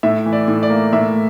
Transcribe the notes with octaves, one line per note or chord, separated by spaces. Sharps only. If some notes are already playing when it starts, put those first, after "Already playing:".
A2 E5
E3
D5
A2
D5
A#3
A2 E5